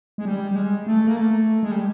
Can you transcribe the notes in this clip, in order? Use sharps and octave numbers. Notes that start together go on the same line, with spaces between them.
G#3
G3
G3
G#3
A3
A#3
A3
G#3
G3